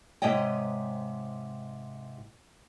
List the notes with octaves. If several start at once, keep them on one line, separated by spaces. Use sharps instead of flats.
G#2 C3 C#5 D#5 G5